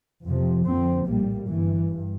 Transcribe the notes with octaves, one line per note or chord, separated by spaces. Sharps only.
F2 C3 F3
F2 D3 F3 C4
A#1 A2 G3 A#3
G1 G2 E3
G2